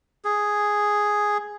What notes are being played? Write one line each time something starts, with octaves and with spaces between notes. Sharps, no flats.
G#4